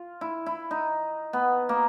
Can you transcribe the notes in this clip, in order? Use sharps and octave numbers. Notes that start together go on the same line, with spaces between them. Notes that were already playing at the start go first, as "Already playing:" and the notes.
Already playing: F4
E4
E4
D#4
B3
A#3